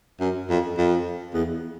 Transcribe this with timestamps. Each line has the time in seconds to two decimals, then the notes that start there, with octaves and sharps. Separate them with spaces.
0.20 F#2
0.50 F2
0.78 F2
1.34 E2